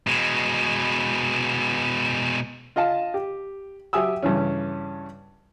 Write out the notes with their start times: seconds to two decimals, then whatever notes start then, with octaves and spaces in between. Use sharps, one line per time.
0.07 B2 G#3
2.76 F4 D#5 F5 A5
3.14 G4
3.93 F#3 G4 E5 G#5 D#6 E6
4.23 G2 C#3 E3 C#4